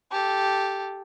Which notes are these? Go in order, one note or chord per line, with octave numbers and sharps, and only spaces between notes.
G4 A4